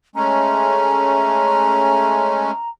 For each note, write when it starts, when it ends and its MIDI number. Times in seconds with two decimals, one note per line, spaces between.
0.16 2.51 56
0.16 2.51 57
0.16 2.51 61
0.16 2.69 82